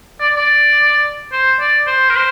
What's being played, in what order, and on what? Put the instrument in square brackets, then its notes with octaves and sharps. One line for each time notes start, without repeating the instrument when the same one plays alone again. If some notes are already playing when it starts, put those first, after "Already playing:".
[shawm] D5
D5
C5
D5
C5
A#4
C5